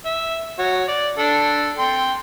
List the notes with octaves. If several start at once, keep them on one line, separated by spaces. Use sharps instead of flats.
E5
F#4 C#5
D5
D4 A4
G5 C6